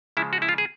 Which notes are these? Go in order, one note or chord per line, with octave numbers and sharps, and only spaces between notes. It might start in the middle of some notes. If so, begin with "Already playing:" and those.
C#3 F3 G#3 E4
F#4
E4
F4
G#4